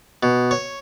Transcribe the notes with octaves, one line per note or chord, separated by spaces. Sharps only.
B2
C#5